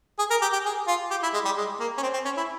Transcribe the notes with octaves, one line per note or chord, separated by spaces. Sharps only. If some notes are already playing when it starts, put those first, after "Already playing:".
G#4
A#4
G4
G4
G#4
F4
G4
E4
G#3
G3
G#3
A#3
C#4
C4
C4
C#4
E4